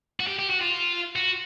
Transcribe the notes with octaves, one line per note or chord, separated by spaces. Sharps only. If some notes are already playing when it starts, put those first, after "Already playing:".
F#4
G4
G4
F#4
F4
F#4